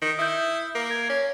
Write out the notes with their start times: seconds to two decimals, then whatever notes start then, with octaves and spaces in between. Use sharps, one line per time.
0.02 D#3
0.19 E4 D#6 G6
0.75 A#3
0.91 G#6
1.10 C#4